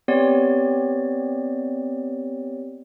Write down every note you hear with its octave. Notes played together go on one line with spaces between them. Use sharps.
B3 C4 G4 C#5 D5